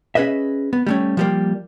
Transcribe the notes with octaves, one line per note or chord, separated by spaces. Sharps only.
C#4 G#4 B4 D#5 E5
B3
G3 A3 C#4
F3 G3 A#3